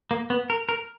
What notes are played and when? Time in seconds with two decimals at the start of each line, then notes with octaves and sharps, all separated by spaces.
0.11 A#3
0.30 B3
0.50 A#4
0.69 A#4